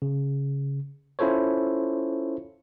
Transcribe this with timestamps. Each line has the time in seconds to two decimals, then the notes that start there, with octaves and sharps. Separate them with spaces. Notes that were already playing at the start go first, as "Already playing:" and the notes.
0.02 C#3
1.19 C#4 E4 F4 A4 C5 C#5